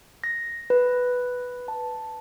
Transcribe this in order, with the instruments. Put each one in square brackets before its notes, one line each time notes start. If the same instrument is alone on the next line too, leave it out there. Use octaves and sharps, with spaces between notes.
[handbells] A#6
B4
A5